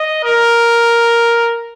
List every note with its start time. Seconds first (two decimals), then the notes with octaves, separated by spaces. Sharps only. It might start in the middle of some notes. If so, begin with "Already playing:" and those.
Already playing: D#5
0.24 A#4